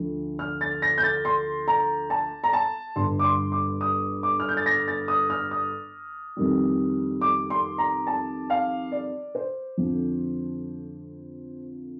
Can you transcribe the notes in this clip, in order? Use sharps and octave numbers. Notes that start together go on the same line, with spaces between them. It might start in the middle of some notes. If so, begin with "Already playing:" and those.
Already playing: D2 D3 F3
F6
A6
A#6
G6
A6
C6
A#5
A5
A#5
A5
G1 G2 D3 C6
D6
C6
D6
D#6
D6
F6
G6
A6
A#6
A6
D#6
F6
D#6
F2 D#3 G3
D6
C6
A#5
A5
F5
D5
C5
F2 D3 F3